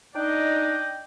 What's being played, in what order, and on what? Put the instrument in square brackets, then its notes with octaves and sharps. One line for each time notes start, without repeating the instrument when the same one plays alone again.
[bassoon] D4 [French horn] D#4 [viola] D5 D#5 [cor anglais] G5